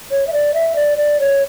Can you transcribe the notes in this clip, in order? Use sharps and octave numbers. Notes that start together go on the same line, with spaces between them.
C#5
E5
D5
E5
D5
D5
C#5